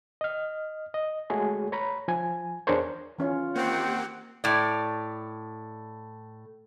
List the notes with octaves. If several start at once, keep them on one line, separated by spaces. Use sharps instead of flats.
D#5 F6
D#5
G#3 A3 F#4 G#4 C#5 G#5
C#5 A#5 B5
F3 G#5
E2 D4 G#4 A#4 C5 C#5
E3 C#4 F4 C#5
D#3 A#3 C4 G4 F#5
A2 D5